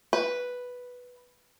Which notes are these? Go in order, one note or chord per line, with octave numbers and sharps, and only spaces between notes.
B4